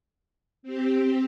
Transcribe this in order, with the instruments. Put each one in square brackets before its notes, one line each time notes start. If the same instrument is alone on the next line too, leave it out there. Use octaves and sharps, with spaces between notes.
[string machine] C4 G4